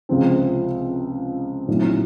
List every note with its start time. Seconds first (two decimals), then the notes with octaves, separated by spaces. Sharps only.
0.09 C#2 C3 F3 C4
1.68 A#1 A2 F#3 C4 D#4